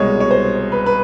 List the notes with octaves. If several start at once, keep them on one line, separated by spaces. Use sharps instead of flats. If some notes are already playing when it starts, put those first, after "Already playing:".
Already playing: C2 B2 G#3 C#5
C#5
C5
B4
B4